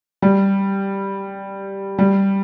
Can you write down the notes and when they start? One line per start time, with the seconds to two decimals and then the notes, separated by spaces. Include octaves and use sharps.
0.22 G3
1.99 G3